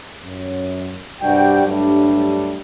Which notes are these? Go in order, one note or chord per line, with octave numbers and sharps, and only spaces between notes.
F#2
G2 C3 G3 D4 F#4 G5
G2 F#3 G3 A3 D4